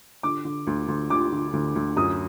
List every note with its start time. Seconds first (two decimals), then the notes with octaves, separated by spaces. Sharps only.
0.23 D3 D6
0.45 D3
0.67 D2
0.88 D2
1.10 D3 D6
1.32 D3
1.53 D2
1.75 D2
1.97 F#2 D#6